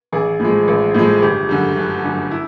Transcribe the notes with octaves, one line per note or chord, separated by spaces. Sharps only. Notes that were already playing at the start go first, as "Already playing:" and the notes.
A1 G#4
A2 F3 G#3
A1
A2 F3 G#3
G1 G4
F#2 D3 G3
G1
F#2 D3 G3
E4